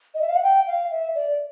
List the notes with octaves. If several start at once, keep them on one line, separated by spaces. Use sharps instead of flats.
D#5
E5
F5
F#5
G5
F5
E5
D5